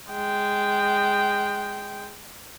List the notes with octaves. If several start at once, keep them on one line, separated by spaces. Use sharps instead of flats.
G#3 G5